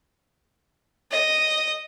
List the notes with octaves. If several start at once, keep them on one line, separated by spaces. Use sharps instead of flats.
D#5